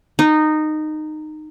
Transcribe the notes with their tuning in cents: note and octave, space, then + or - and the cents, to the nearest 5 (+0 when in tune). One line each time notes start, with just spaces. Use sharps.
D#4 -15